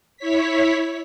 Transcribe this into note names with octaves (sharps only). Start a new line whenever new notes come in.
E4 C#5 B6